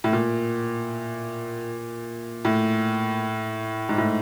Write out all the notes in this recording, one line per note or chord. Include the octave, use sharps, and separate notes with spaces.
A2
A#2
A2
G#2
A2